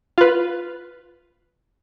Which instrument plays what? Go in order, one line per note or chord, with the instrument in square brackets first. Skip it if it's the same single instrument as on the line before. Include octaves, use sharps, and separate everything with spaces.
[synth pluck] F4 B4